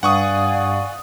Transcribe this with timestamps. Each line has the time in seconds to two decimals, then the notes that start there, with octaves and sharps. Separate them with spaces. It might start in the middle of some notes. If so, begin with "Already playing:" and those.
0.03 G2 D5 F5 F#5 G#5 C#6 D#6